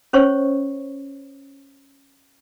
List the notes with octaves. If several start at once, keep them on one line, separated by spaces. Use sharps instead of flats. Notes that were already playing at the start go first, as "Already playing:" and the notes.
C#4 C5 C#5 C#6